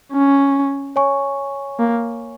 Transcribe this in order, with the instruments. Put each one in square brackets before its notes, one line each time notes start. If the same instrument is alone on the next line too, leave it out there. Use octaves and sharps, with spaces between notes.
[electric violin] C#4
[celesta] C#5 G#5 C#6
[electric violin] A#3